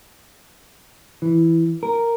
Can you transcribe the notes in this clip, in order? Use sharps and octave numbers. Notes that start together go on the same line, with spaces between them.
E3
A#4